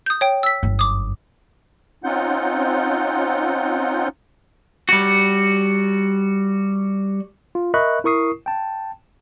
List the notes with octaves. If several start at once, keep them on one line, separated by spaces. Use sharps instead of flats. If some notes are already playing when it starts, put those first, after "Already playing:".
D#6 G6
C#5 G5
E6 B6
G1 F#2
D6 D#6
C4 C#4 D#4 F4 F#5 G6
G3 F#4
F4
A#4 D#5 E5 B5 C#6 F#6
E4 A#4 C#6 D#6 C7
G5 A5